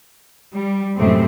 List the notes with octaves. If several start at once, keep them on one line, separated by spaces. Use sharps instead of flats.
G3
F#2 A2 C3 G#3 A3 C4